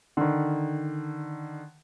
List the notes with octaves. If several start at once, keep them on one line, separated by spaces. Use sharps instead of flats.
D3 D#3